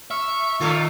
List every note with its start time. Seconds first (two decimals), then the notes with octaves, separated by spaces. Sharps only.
0.11 E5 C#6 E6 F6
0.60 A#2 D#3 A3 F4